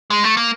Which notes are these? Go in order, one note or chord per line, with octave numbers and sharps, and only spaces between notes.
G#3
A3
A#3